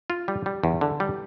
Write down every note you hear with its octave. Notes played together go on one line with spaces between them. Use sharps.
F4
G3
G3
E2
D3
G3